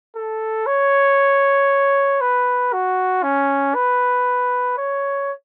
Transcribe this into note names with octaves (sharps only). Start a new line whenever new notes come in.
A4
C#5
B4
F#4
C#4
B4
C#5